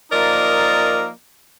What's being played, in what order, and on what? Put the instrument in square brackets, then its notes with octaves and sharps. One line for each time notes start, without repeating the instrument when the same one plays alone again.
[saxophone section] F3 A#3 D#4 A#4 D5 D#5